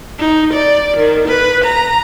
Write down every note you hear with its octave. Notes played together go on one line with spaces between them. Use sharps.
D#4
D5
D#3
B4
A#5